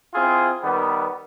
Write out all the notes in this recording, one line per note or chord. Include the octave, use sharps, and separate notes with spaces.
C4 E4 F4 G#4
D#3 G3 B3